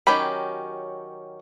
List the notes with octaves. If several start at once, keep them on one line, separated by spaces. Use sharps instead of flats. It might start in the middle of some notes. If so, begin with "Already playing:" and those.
D#3 F#3 C#4 G4 B5